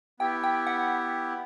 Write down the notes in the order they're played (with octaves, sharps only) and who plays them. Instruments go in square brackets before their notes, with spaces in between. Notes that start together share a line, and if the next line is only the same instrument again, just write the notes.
[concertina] B3 E4 G4 [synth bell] G5
[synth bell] G5
F#5